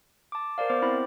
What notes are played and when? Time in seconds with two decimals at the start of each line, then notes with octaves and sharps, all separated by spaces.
0.32 A5 D6
0.58 A#4 C5 D5 F5
0.70 B3 C5 D6
0.82 C4 E4 C5 B5